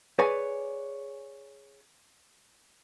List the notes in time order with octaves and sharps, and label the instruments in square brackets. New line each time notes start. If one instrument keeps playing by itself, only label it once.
[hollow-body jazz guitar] G#4 B4 C#5 D5 G#5